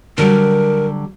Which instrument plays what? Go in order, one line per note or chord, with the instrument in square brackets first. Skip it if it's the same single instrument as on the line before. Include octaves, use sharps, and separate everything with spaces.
[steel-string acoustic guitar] D3 F#3 G3 [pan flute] A#4